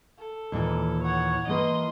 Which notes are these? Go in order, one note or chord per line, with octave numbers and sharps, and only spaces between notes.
A4
D#2 A#2 E3
C#5 F#5
E3 A#3 B4 D#5 C6